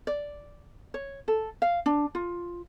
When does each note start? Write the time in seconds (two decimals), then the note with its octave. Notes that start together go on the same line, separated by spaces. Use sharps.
0.07 D5
0.94 C#5
1.28 A4
1.62 F5
1.86 D4
2.15 F4